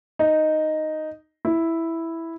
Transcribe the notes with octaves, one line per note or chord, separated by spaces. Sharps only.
D#4
E4